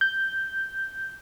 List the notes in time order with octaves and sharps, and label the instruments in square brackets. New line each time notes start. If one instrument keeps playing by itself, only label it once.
[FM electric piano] G6